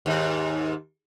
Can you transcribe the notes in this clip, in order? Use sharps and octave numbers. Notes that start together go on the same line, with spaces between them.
D#2 G#2